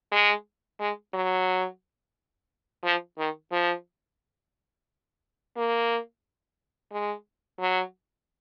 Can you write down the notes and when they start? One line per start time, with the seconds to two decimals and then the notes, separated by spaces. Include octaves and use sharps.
0.12 G#3
0.80 G#3
1.14 F#3
2.84 F3
3.18 D#3
3.51 F3
5.57 A#3
6.92 G#3
7.60 F#3